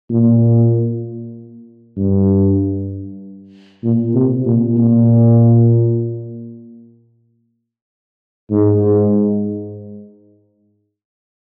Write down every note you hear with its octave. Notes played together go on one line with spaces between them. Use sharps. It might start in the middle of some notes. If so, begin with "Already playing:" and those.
A#2
G2
A#2
C3
A#2
A#2
G#2